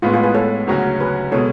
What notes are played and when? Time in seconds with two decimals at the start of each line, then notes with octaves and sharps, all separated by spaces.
0.02 A2 G#3 B3 F4
0.13 F4 G#4
0.23 G#4 B4
0.35 A4 C#5
0.67 D2 C#3 F#3 C#4 F#4
1.00 G#4 B4
1.32 B2 G#3 A4 C#5